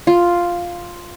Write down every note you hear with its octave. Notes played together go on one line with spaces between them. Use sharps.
F4